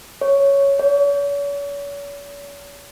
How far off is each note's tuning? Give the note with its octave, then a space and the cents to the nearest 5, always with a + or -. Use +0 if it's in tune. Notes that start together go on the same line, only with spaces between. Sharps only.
C#5 +5
C#5 +40